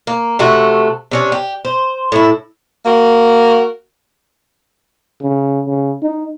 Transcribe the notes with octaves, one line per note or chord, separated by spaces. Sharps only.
A#3
C3 A3 F#4
C3 C#4 D4
G4
C5
A2 E4
A#3 F#4 A#4
C#3
C#3
D#4